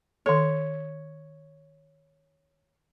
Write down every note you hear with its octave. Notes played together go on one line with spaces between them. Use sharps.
D#3 A4 C#5